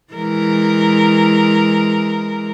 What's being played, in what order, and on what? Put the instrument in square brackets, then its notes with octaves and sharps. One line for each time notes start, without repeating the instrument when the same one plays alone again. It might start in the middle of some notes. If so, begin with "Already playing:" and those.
[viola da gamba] E3 G#3 A#4